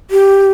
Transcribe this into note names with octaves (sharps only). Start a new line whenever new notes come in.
G4